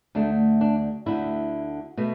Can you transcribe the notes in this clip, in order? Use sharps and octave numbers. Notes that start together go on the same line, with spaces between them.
D2 D3 A3 D4
D4
D2 D3 A3 E4
B2 A3